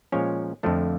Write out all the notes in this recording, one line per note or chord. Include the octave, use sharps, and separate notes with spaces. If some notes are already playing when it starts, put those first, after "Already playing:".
A#2 F3 G#3 C#4 C#5
F2 D3 F3 A3 D4